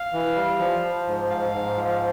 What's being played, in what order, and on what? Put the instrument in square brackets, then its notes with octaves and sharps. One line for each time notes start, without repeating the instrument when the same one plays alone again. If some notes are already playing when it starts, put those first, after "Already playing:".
Already playing: [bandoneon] F5
E3
G3
F3
F3
G#2
G#2 F5
G#2
F3